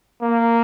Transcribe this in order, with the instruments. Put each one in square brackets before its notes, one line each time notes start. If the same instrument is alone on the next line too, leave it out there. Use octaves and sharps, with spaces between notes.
[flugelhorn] A#3